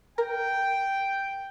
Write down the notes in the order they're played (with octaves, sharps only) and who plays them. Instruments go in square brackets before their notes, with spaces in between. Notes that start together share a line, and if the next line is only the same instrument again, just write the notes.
[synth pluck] A#4 [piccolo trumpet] G5